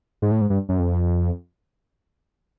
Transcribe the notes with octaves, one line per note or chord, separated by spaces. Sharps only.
G#2
A2
G#2
G2
F#2
F2